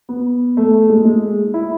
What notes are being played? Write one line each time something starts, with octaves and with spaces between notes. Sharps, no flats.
B3
A3
G#3
G#3
E4